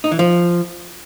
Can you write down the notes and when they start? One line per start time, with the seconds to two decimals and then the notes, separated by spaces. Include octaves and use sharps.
0.04 D#4
0.12 E3
0.19 F3